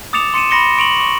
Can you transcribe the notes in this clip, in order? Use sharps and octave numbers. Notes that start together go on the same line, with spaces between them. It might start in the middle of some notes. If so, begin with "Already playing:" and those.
D6 D#6 A6 C#7 E7 F7
C6 C#7 D#7 E7
B5 C6 A#6 C#7 G7
C#6 D7 F7 F#7
C#6